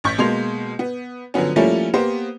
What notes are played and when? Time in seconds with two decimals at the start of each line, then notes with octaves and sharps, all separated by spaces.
0.04 A1 C#6 G6 B6
0.19 B2 G#3 A#3 C6 G#6 F7
0.79 B3
1.34 D3 F3 F#3 B3 C#4
1.56 F3 G3 A3 A#3 C#4 E4
1.94 A#3 B3 G4 C5